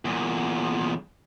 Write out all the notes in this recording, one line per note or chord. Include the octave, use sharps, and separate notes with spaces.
E2 A#2